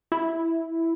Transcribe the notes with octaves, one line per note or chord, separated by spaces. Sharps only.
E4